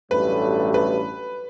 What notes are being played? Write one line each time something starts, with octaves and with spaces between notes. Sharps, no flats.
A1 G2 F#3 A3 B4
B4